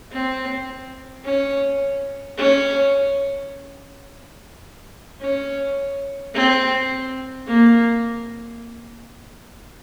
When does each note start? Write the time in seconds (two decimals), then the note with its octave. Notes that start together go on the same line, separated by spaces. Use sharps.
0.12 C4
1.24 C#4
2.37 C#4
5.20 C#4
6.35 C4
7.47 A#3